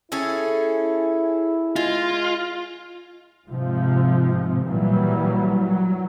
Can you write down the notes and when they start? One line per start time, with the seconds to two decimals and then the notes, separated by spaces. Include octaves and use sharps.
0.12 C#4 E4 G#4 A4
1.76 G#3 F4
3.47 G#2 C3 F3
4.65 A#2 E3 F#3 G3
5.65 F#3